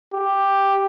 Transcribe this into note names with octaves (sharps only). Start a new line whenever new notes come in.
G4